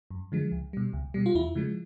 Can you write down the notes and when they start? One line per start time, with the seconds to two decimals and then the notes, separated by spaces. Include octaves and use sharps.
0.11 F#2
0.32 D3 F3 G#3
0.52 C#2
0.73 B2 G3
0.93 C#2
1.14 B2 G3
1.26 F4
1.35 E2 E4
1.55 C#3 F3 G#3